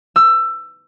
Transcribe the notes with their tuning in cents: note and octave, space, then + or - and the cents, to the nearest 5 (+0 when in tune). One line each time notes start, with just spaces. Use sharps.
E6 +20